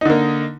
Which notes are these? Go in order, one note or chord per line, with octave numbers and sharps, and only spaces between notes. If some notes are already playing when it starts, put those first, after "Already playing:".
D3 A#3 D#4